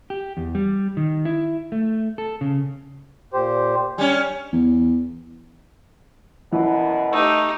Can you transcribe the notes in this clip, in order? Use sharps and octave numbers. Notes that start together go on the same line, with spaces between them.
G4
E2
G3
D#3
E4
A3
A4
C#3
A#2 G4 C5
G3 C#4 G#5
E2
F#2 B2 E3
A3 D#4 G4